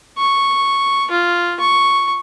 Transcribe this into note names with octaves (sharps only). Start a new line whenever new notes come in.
C#6
F4
C#6